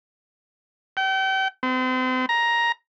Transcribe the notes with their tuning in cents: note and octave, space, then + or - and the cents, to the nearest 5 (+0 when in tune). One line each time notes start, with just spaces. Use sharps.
G5 -35
C4 -35
A#5 +10